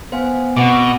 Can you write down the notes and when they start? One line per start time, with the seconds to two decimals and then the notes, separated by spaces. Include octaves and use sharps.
0.12 B3 C5 F5 G#5
0.57 B2 C4 F#5 D6